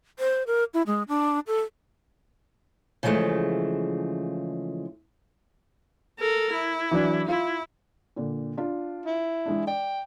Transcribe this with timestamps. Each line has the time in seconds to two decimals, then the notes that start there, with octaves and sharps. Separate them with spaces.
0.19 C5
0.47 A#4
0.74 E4
0.87 G#3
1.08 D4
1.47 A4
3.03 C#3 E3 F3 G#3 A3
6.20 A4 A#4
6.52 E4
6.91 E3 F#3 D4
7.28 E4 F4
8.16 A#2 D3
8.57 D4 F4
9.06 E4
9.46 E3 G#3 D4
9.67 D5 G5